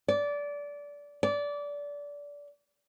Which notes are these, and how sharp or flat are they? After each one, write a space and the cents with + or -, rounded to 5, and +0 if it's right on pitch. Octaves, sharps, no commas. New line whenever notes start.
D5 -20
D5 -20